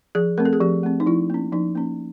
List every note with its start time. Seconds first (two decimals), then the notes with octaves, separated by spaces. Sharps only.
0.15 F3 G#4
0.38 A3 C4 A#4
0.45 A4
0.53 G#4
0.60 F3 G4
0.83 A3 C4
1.00 D#4
1.06 F3 E4
1.30 A#3 C#4
1.52 F3 D#4
1.75 A#3 C#4